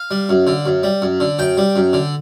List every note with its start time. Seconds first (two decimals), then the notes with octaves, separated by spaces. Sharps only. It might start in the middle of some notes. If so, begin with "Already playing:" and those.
Already playing: F5
0.11 G3
0.29 F#2
0.47 D3
0.66 F#2
0.83 G3
1.02 F#2
1.20 D3
1.39 F#2 G5
1.58 G3
1.76 F#2
1.93 D3